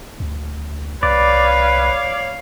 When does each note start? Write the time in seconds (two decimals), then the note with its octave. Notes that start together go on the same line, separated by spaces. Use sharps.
0.20 D2
1.03 C2 B4 C#5 D5 F5